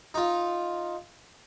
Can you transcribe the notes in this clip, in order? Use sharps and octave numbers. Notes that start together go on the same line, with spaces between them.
D#4 F4